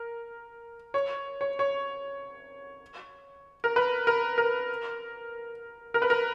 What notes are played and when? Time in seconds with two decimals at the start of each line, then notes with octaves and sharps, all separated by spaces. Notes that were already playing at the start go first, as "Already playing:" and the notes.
Already playing: A#4
0.94 C#5
1.41 C#5
1.59 C#5
3.64 A#4
3.76 B4
4.07 A#4
4.38 A#4
5.94 A#4
6.02 B4
6.10 A#4